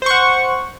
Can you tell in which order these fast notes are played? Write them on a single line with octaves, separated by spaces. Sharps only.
C5 C#6 F#5